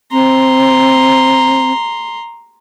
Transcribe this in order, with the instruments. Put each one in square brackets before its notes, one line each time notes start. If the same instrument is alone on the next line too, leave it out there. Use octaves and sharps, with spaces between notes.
[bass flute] C4 [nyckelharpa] A#5 C6